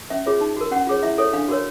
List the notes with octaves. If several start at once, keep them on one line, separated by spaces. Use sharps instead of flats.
C#4 E5
F4 G#4 C#5
D#4
F#4 A#4
C#4 F#5
F4 G#4 C#5
E4 E5
A4 C#5
D4 F5
F#4 A#4 C#5